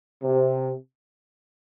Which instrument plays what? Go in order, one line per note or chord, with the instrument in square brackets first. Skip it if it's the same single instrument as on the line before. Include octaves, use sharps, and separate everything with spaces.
[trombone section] C3